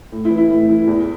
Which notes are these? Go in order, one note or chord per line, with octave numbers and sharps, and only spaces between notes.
A2
E4
E3
E4
A2
E3
E2